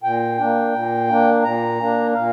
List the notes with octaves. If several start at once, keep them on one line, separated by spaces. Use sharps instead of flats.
A#2 G5
A#3 D4
A#2
A#3 D4
A#2 A#5
A#3 D4
A#2 F5